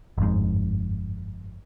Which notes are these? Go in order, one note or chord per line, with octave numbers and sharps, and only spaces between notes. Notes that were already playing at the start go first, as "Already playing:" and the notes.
G1 F2 G#2